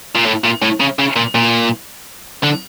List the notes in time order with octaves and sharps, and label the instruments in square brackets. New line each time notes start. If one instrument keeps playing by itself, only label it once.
[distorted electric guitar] A#2
A2
A#2
A2
C#3
C#3
A#2
A#2
D3